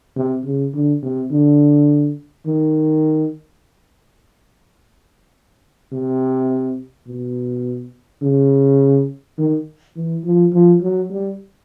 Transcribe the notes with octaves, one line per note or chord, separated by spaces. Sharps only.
C3
C#3
D3
C3
D3
D#3
C3
B2
C#3
D#3
E3
F3
F3
F#3
G3